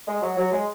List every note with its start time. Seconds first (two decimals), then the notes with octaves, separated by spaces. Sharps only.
0.07 G#3
0.22 F#3
0.37 F#3
0.52 G#3